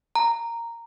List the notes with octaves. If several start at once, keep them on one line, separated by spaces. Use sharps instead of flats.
A#5